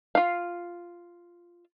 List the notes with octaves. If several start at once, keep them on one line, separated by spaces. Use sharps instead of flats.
F4 F5